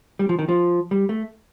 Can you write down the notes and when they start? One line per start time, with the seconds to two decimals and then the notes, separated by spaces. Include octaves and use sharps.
0.19 G3
0.29 F3
0.39 D#3
0.49 F3
0.91 G3
1.09 A3